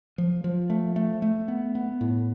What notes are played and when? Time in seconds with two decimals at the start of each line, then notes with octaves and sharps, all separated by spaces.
0.18 F3
0.44 F3
0.70 A3
0.96 A3
1.22 A3
1.48 B3
1.75 B3
2.01 A2